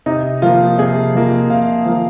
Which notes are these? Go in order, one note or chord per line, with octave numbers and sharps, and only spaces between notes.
C3 D#4
F3 A#3 F4
C3 G#4
F3 A#3
C3 F5
F3 A#3